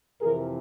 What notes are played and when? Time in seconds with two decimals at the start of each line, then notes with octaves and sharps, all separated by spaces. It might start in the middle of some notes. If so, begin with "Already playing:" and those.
0.21 F2 C3 E3 G#4 A#4